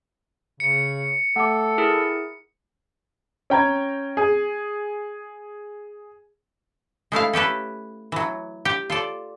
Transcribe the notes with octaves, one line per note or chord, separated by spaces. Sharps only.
C#3 C#7
A3 A4 F#5 D6
E4 G#4 A#4
C#4 G5 A#5 G#6
G#4
G#3 A3 E4 F5
C#4 G4 A4 B4
E3 F#3
G4
F4 A4 D5